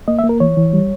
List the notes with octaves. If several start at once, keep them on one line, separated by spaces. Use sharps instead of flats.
A#3 D#5
E5
A#3
A#4
E3 C#5
E3
G3